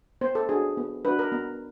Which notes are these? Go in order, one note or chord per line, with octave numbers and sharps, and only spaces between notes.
B3 C5
A4
D4 F#4 G#4
B3
D4 F#4 B4
A#4
B3